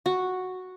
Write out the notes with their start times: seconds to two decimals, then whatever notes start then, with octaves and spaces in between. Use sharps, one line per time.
0.06 F#4